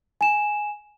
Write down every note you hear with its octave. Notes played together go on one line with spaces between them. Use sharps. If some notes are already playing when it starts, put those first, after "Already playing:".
G#5 E7